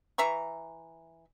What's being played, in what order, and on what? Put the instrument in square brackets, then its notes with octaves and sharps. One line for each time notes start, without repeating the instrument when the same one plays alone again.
[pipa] E3 E5 A#5 C#6